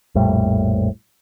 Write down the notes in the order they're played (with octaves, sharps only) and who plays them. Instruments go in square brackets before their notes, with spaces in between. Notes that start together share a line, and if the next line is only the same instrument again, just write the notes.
[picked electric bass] A#1 F2 A2 G3